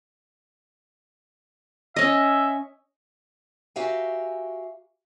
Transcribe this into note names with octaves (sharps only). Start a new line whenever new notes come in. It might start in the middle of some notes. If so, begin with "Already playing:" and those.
C#4 D#5 E5
F#4 G4 A#4 E5 F5 G#5